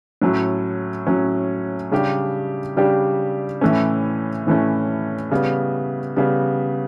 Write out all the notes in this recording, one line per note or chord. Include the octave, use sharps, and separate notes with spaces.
A2 F#3 C#4
A2 F#3 C#4
C#3 G3 D4 G4
C#3 G3 D4 G4
A2 E3 A3 C#4
A2 E3 A3 C#4
C#3 G3 B3
C#3 G3 B3